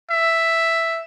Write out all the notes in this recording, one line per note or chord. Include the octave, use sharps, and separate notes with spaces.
E5